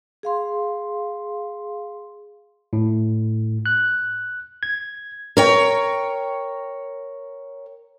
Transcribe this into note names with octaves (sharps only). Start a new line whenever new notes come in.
G#4 F5 C6
A2
F#6
G#6
A#4 C#5 G5